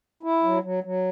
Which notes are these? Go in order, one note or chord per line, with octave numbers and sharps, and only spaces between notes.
E4
F#3
F#3
F#3